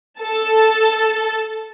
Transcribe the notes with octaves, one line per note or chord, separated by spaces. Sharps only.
A4 A5